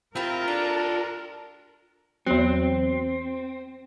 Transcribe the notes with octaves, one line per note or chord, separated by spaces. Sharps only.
C4 E4 F4 G4 A#4 E5
D4 G4 A4
E2 F#3 C4